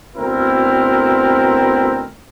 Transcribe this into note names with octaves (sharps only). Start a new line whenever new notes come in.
D2 B2 C4 E4 A#4